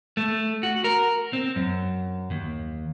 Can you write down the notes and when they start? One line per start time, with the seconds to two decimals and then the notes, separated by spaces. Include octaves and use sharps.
0.17 A3
0.63 F#4
0.84 A#4
1.33 C4
1.56 F#2
2.31 D#2